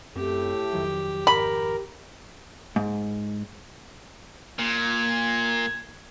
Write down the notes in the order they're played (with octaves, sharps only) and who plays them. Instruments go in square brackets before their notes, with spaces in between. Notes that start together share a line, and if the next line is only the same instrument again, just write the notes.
[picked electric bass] F#2 C4 [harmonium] A2 A3 [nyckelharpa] G4
[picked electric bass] F2 D#3 F#3
[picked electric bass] G#1 F2 [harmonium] A#4 [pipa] B5
[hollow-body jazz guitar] G#2
[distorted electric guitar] A#2 [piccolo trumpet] G#6